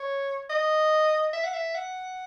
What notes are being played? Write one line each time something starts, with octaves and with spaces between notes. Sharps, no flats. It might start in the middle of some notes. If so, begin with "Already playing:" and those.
Already playing: C#5
D#5
E5
F#5
E5
F#5